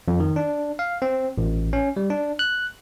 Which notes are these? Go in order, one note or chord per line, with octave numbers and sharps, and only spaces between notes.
F2
D#3
D4
F5
C4
A1
C#4
G3
D4
F#6